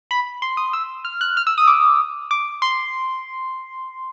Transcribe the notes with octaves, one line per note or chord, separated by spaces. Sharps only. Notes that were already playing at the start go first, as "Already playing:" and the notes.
B5
C6
D#6
E6
F6
F#6
F6
E6
D#6
D6
D6
C6